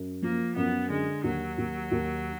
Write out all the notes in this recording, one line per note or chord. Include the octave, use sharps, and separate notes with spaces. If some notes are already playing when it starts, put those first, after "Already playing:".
Already playing: F#2
F3 A#3
F#2 B3
D3 G#3
D#2 F#3
D#2
D#2